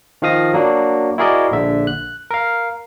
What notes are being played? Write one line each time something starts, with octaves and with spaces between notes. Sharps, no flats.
D#3 F3 F5 D#6 A#6
F#3 A#3 D4 F#4
E4 F#4 G#4 A#4 D5 D#5
A#1 D3 E5
F#6
A#4 F5